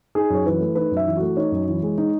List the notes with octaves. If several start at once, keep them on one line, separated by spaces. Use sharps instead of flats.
D#4 G#4
F#2 C#5
E3 B4
A3
D#4 B4
F#2
E5
E3
A3 F#4
D#4 C#5
F#2
E3
G#3
D#4